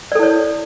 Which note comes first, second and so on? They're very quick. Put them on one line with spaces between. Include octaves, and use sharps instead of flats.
D5 A4 E4 C#5